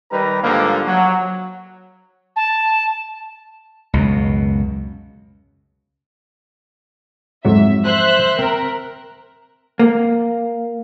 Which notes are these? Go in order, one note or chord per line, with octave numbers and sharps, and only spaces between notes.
D#3 G3 B4 A#5
G#2 D3 F3 G3 A#3
F#3
A5
C#2 F#2 B2
F2 G#2 F#3 E5
C5 E5 F#6
C4 A#4
A#3